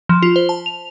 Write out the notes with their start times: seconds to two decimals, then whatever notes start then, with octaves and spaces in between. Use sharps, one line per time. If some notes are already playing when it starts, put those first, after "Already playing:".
0.09 F3
0.22 F4
0.36 C5
0.49 A5
0.66 F7